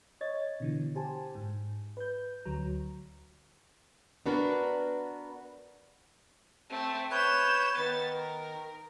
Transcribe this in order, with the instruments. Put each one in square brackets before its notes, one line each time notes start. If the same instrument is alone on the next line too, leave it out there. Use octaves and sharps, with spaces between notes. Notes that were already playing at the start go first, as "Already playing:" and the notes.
[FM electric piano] C#5 D#5 G#6 A6
B2 D3 E3
G4 C5 G#5 A5
G#2
B4 G6
D2 F#3 A#5
[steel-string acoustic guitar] B3 D4 F#4 A#4 B4
[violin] A3 C4
[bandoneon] B4 C#5 [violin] G6 E7
[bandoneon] D#3 [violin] B3 A6
[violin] A#4